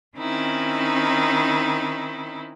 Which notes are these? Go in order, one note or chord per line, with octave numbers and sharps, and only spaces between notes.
D#3 C4 C#4 D#4 E4